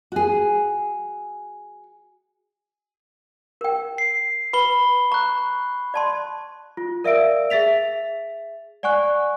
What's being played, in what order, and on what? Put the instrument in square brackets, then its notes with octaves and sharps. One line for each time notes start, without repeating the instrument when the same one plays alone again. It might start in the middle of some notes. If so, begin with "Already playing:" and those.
[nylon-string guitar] F#4 G#4
[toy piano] A#4 G5
[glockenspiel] C7
[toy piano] B4 [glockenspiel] B5 G7
[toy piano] A#5 [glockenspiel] C#6 F#6
[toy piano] D5 A5 C6
[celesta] F4
A#4 D5 E5 F5 E6 D7
G#4 E5 A6 B6 F7
D5 F#5 G#5 C#6 F#6